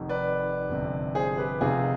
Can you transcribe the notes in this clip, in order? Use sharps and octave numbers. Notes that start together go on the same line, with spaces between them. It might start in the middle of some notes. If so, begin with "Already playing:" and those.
Already playing: F1 F2 D#3
B4 D5
G1 F2 C3
G#4 C5
G4 B4
F1 F2 C3 D#3 F4 G#4